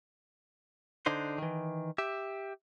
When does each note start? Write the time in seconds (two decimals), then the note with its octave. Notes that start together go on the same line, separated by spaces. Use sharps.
1.06 D3 D4 D#4 C5
1.38 D#3 E3
1.98 G4 E5